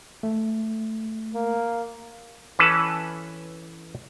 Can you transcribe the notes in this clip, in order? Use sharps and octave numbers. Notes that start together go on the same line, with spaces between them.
A3
A#3
E3 C#4 A4 B4 A5